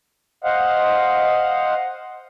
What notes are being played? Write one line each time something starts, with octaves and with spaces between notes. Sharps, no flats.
C5 D#5 F5 F#5